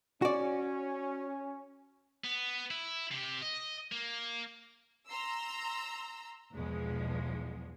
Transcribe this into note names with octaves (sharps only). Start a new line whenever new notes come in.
C#4 F#4 D5
B3
E4
C3 G4
D#5
A#3
A#5 C6 E6
B1 E2 F3 G#3